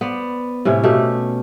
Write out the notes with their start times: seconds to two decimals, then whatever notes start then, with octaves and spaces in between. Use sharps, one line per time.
0.01 B3 C5 D5
0.65 A2 C3 C#4 E4
0.83 B2 A3 F4 G4